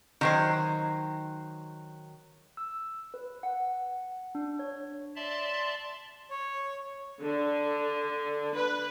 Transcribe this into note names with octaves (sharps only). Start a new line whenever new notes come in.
D#3 F#3 C5
E6
B4
F#5
D4
C#5
D5 E5 A5 C6
C#5
D3
B4